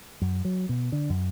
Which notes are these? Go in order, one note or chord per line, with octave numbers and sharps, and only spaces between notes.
F#2
F#3
B2
D3
F#2